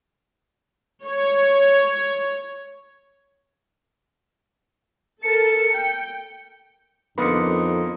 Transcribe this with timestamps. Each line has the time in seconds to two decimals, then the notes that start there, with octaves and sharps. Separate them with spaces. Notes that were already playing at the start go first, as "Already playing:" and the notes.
1.05 C#5
5.23 A4 A#4 A5 C#7
5.72 G5
7.18 F2 D3 A#3 B3 D#4 C6 D#6 C#7